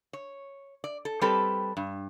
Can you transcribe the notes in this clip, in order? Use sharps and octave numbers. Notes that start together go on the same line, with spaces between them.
C#5
D5
A4
G3 C4 G4 A4 B4
G2